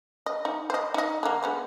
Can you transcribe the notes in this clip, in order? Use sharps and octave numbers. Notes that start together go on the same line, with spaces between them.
D#5
D#4
C5 D#5
D#4 D#5
D3 A#3
G#3 B3 C5